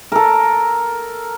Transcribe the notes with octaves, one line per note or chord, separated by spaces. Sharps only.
A4 A#4